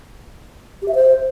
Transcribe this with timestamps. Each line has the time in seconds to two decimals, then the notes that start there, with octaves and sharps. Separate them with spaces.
0.82 G4
0.88 E5
0.95 C5